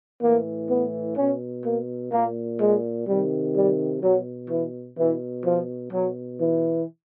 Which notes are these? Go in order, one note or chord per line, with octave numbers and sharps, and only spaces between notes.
A2 E3 A#3
B3
B2 C#4
A#3
A#2 A#3
G#3
C3 D#3 G3
G3
B2 F#3
E3
B2 E3
F3
B2 F#3
E3